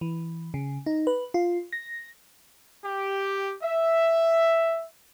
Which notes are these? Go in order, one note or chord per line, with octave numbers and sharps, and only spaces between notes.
E3
C#3
D#4
B4
F4
A#6
G4
E5